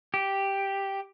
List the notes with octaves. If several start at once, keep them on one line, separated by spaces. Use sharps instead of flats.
G4